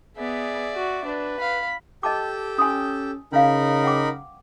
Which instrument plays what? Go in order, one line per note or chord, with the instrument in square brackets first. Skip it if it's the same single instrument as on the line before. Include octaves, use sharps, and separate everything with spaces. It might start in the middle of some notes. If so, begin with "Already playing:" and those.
[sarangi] B3 [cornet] G#4 [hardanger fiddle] D5 E5
[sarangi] F#4
[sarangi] D4 [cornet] B4
[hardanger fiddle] F5 [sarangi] B5
[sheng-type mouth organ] G4 A4 G5 [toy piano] D#5 A5 D6
[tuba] C#4 [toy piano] G#5 C6 D#6
[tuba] C#3 [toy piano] C#4 F5 [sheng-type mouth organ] D#4 A#4 B5
[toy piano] F#5 G5 D6